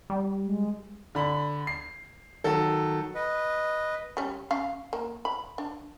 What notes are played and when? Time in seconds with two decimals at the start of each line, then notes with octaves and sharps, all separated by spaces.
0.10 G3
0.44 G#3
1.15 D3 B5
1.67 C7
2.44 D#3 F#3 A4
3.15 B4 D#5
4.17 G3 C#4
4.51 C#4 F5
4.93 A#3
5.25 B5
5.58 D4